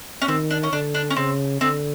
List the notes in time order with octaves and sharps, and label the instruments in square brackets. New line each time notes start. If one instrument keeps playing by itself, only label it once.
[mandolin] C#4
[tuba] D#3 [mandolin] C4
[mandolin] D4
C#4
[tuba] D3 [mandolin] D4
[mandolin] D4
C#4
[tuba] C#3 [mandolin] C4
[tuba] D3 [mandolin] C4